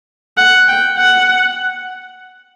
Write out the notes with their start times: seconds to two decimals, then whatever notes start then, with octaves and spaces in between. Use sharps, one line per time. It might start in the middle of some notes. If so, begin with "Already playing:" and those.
0.37 F#5
0.68 G5
0.98 F#5